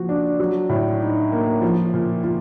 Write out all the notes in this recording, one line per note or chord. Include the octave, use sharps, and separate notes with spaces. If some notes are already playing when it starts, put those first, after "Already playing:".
Already playing: F3 A#3 F#4
D4
F#3
A2
D#4
A#3
F3
A#2
A#2